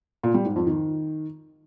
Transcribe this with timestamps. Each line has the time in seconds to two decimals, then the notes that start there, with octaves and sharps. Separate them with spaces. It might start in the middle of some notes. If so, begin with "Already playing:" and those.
0.23 A#2
0.34 G3
0.45 G#2
0.56 F2
0.67 D#3